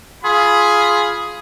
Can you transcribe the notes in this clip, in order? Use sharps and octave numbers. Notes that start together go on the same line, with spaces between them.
F4 G#4 B5 C6